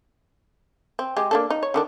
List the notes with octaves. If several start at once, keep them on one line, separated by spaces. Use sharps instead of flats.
C4
G#3 G4
A#3 D4 A4
D#4
C#5
D3 D#3 D4